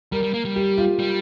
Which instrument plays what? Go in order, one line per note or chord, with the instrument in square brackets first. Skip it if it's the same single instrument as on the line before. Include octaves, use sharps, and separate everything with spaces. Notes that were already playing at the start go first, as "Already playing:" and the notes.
[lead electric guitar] G3 [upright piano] A#4
[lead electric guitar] G3
A#3
G3
[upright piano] G4
F4
[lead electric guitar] G3